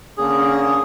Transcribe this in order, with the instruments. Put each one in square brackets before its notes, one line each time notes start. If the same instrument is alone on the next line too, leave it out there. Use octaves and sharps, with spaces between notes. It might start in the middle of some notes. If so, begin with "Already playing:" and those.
[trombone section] D3 A#3 C#4 [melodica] G#4